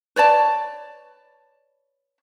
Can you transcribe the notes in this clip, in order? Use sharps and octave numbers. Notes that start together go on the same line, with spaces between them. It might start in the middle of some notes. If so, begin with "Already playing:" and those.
B4 C#5 D5 A5